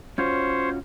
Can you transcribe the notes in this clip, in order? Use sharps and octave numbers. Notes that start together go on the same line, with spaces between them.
C#4 F4 F#4 C5 C#5